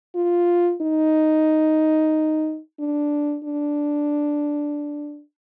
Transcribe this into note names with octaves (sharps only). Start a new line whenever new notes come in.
F4
D#4
D4
D4